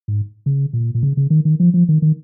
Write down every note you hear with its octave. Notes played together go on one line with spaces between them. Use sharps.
G#2
C#3
A#2
A#2
C#3
C#3
D#3
D#3
F3
F3
D#3
D#3